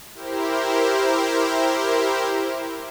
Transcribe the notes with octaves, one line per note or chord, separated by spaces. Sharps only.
E4 G4 A#4 C5